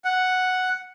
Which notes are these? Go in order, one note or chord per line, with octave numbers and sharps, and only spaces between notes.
F#5